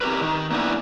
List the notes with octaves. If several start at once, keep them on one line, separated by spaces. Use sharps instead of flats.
C4 G4 A#4 B4
D#3
A#3 B3 C#4 D4 E4